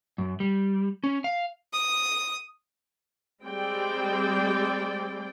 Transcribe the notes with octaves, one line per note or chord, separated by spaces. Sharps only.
F#2
G3
C#4
F5
D#6
G3 G#3 C4 D5 G5